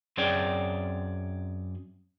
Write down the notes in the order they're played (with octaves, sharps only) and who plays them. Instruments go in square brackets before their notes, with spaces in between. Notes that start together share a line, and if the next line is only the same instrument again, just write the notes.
[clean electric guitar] F#2 C4 G#4 C#5 D5 G5